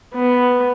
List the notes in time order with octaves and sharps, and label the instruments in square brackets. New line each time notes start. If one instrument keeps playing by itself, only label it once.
[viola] B3